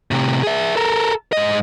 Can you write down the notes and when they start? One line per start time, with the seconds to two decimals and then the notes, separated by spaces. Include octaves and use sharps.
0.11 A2 C3
0.43 G#4 E5
0.76 A4 A#4
1.33 G#2 D#5